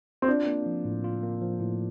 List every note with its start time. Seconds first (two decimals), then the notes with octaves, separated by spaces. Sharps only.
0.22 C4
0.28 D4 F4
0.47 A#3
0.66 F3
0.85 A2
1.04 F4
1.23 A#3
1.41 F3
1.60 A2